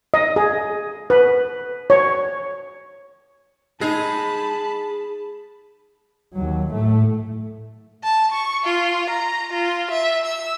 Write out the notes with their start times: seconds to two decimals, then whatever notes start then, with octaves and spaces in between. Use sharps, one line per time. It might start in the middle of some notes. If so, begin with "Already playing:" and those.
0.14 D#5
0.36 G#4
1.10 B4
1.90 C#5
3.81 G#3 D#4 G#4 A5 B5
6.33 D#2 F#3
6.72 A2 A3
8.04 A5
8.32 C#6
8.65 F4
9.10 A#5
9.53 F4
9.91 E5
10.26 E6